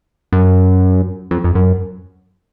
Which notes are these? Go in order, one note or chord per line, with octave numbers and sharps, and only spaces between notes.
F#2
F2
F2
F#2